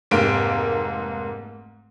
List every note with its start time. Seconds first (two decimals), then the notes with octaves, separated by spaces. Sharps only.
0.11 F1 G#2 A#3 D7